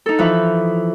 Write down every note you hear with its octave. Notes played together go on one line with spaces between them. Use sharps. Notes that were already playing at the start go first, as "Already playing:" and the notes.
D#4 A4
E3 F3 B4 E5 B5